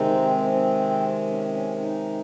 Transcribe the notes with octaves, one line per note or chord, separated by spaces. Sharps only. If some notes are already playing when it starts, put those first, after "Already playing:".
Already playing: C3 D#3 G#3 C4 D#4
C#4
C4
C#4
C#4
D#4